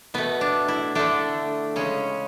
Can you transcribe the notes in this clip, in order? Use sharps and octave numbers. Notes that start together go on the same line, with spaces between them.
B2 A3 B3
D4
E4
D3 A3 D4
C#3 G#3 C#4